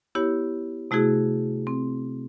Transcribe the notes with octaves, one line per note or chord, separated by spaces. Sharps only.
B3 E4 G4 C#5
C3 A3 E4 F#4 G#4
C4